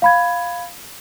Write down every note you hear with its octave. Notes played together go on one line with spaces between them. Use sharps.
F5 B5 G#6